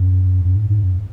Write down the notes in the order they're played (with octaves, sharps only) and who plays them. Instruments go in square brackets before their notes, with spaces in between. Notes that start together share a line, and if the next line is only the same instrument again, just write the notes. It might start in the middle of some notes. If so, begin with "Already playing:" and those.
Already playing: [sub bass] F#2
F#2
G#2
G#2
F#2